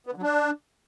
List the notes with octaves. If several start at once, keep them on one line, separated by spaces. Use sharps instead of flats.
B3
D3
F#3
D4